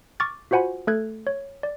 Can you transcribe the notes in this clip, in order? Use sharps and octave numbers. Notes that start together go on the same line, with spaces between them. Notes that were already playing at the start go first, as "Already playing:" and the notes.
C#6 D6 F6 A6
F4 F#4 C5 F#5 G#5 B5
A3 A4 F#6 G#6
C#5
D5